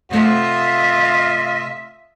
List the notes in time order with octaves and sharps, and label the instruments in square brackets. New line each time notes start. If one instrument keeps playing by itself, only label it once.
[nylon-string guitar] C3 A3 F#5 [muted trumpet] F4 [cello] D#5 E5